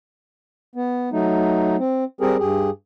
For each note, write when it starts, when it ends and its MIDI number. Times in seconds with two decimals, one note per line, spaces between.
0.75 1.09 59
1.12 1.76 54
1.12 1.76 57
1.12 1.76 63
1.79 2.04 60
2.21 2.37 55
2.21 2.37 60
2.21 2.37 67
2.21 2.37 68
2.21 2.37 70
2.39 2.70 43
2.39 2.70 67
2.39 2.70 68